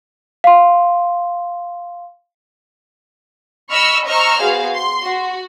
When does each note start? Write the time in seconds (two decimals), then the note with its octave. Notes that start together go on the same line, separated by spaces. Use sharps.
0.44 F5 C6
3.71 D#5 B5 C#6 E6 F6
4.06 C5 D#5 A#5 C#6 E6 F6
4.41 B3 F#4 G#4 C5 F5
4.74 C6
5.05 F#4